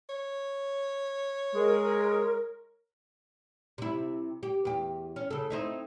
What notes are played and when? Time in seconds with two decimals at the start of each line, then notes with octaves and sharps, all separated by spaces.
0.09 C#5
1.54 G#3 A#4
3.78 C3 E4
4.43 G4
4.65 E2 G4
5.16 C#4
5.31 C#3 A4
5.50 C4 D#4 E4